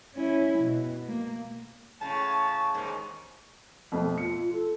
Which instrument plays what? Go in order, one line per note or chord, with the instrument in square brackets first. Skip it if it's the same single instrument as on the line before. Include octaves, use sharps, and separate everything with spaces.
[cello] C#4 E4
B2
A#3
[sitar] A2 C#3 [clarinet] A5
[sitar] D#2 G#2 D#3
[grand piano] F2 B2 A3
[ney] F4 [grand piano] C#7
[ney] A4